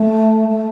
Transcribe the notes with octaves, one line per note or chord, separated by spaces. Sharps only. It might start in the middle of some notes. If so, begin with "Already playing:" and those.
Already playing: A3
A3